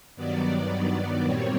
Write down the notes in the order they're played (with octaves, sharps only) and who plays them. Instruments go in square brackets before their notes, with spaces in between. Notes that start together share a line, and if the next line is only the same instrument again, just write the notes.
[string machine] G2 D#3 F#3 B3 D5
A#2 G3 C4 C#5